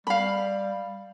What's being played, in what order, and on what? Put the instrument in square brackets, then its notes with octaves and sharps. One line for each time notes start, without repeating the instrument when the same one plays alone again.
[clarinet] G3 [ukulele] F5 B5